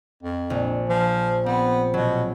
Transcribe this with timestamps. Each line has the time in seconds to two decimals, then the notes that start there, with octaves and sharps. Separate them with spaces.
0.23 F2
0.50 A#1
0.89 F3
1.46 B3 C4
1.94 B2 F#3